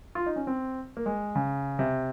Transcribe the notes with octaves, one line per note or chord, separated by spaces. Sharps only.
F4
D#4
C#4
C4
A#3
G#3
C#3
C3